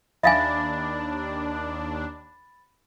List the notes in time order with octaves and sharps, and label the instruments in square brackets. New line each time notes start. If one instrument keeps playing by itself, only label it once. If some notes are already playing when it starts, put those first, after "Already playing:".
[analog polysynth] D#2 D4 [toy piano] E5 F5 G#5 [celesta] B5 A6